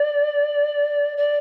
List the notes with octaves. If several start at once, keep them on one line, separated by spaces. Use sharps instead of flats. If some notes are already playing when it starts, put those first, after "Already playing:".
Already playing: D5
D5